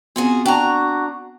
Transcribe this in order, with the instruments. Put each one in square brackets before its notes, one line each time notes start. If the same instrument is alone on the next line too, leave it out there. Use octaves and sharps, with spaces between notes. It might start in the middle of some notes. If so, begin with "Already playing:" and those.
[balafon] B3 C4 [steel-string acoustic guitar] F4 F#4 G#4
[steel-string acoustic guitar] D4 A#5 [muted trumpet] F#4 [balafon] G5 A5